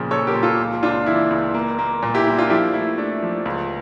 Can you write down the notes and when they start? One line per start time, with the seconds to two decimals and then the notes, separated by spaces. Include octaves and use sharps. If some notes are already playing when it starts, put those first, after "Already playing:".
Already playing: A#2 C#3 F3
0.11 A#2 A4 C#5
0.27 G4 A#4
0.35 A#2
0.43 F4 A4
0.59 C#2
0.83 C#2 D4 F4
1.06 E3 E4
1.31 C#2
1.54 A#3
1.79 A#3
2.03 A#2
2.14 E4 G4
2.26 A#3 E4
2.38 D4 F4
2.50 F3 E4 G4
2.74 A3 E4
2.98 A3 D4
3.23 F3
3.45 C#2